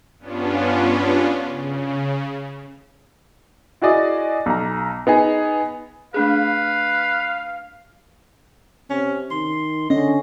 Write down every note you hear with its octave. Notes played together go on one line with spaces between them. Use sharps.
G2 B3 C#4 D4 F4
C#3
E4 F#4 G#4 D5 D#5
B1 A#5
B3 D#4 G#4
A3 D4 G#4 B4 F5
C3 C#4
D#3 C6
D3 C#4 D#5